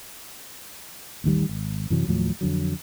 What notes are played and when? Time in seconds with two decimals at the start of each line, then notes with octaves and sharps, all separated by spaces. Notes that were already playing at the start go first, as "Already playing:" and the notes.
1.24 A1 D#2 D#3 G3
1.49 G#1
1.90 F#2 C3 E3 F#3
2.08 D#2 A2 F3 F#3
2.41 F2 D3 F#3